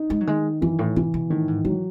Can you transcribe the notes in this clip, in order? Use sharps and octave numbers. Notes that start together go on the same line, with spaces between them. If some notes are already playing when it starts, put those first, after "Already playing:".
Already playing: D#4
G#3
F#3
D#3 G#3
F#2 E3
A2
B2 E3
B2
A2 D#3
G#2
G#2 F#3